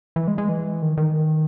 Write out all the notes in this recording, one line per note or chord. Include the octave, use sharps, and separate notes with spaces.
E3
G#3
G#3
E3
D#3
D#3